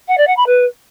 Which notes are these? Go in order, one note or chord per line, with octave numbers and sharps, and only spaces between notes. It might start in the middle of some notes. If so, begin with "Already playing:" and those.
F#5
D5
F#5
B5
B4